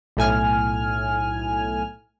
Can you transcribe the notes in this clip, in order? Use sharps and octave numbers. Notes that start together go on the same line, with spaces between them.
B1 A2 G#5 F6